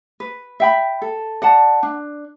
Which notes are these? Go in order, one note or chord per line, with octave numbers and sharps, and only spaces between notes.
B4
E5 G5 B5
A4
D5 F#5 A5
D4